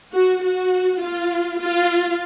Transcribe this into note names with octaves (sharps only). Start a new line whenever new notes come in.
F#4
F#4
F4
F4